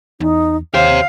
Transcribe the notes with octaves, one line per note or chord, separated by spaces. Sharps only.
E2 D#4
D#2 G4 C5 C#5 F5